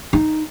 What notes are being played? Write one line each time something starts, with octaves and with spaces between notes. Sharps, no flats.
D#4